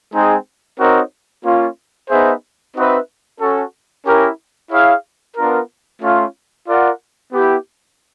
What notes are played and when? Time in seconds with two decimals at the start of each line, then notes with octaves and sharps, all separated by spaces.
0.13 G#3 C4 D#4 G#4
0.79 C4 D#4 F#4 A#4 C#5
1.44 A#3 C#4 F4
2.10 B3 D#4 G#4 C5 E5
2.75 C4 D#4 F#4 B4 E5
3.40 C#4 F#4 A4
4.06 C#4 E4 G4 A#4
4.71 E4 G#4 C#5 F5
5.36 B3 D4 F4 A#4
6.02 A3 C#4 F4
6.67 F4 A#4 D5 F#5
7.33 B3 E4 G4